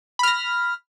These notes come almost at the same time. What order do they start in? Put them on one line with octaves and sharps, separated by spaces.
B5 F6 A#6